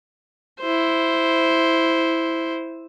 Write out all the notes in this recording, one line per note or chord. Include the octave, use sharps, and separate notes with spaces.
E4 C5